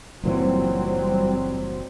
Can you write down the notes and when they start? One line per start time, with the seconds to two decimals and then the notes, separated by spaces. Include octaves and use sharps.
0.24 F#1 A#2 E3 F#3 G3 C4